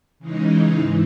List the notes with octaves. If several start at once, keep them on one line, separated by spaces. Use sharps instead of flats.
C#3 E3 G#3 D#4
G#2 E3